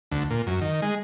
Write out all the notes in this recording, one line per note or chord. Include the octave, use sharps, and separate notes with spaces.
D2
A#2
F#2
D#3
G#3